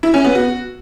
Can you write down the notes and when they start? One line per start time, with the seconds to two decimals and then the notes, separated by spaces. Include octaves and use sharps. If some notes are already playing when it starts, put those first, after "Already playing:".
0.03 E4
0.14 C#4
0.24 B3
0.35 F#4